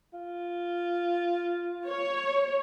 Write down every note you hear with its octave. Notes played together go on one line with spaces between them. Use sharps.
F4
C#5